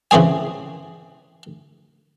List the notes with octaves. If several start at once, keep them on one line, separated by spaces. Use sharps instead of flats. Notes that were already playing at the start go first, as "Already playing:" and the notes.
C#3 E3 C4 G#4 G#5